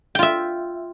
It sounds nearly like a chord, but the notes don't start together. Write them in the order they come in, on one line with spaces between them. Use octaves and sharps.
G5 F4 E5